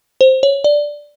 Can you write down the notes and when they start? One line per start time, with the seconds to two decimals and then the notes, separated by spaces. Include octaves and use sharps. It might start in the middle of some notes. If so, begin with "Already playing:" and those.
0.21 C5
0.43 C#5
0.64 D5